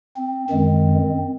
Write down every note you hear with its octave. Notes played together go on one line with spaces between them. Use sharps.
C4
F#2 D#3 G#3 C4